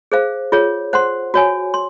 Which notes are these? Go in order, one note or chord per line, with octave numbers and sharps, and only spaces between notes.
G#4 C5 F5
F4 G#4 C#5
C5 F#5 C6
F#4 C#5 G#5
C6